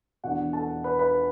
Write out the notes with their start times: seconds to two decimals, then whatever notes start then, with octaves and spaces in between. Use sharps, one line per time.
0.23 E1 E2 B2 B3 D4 F#4 F#5
0.53 A4 A5
0.84 B4 B5
0.99 B4 B5